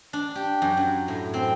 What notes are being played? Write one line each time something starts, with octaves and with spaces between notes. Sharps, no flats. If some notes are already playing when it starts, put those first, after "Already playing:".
D4
G4
F#2
F#3
A2
C4